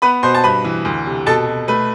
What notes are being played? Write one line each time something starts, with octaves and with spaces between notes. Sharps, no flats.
B3 B4 B5
B2 C5 C6
A5
G2 B4 B5
E3
D2
C3
B2 A4 A5
B2
A3 B4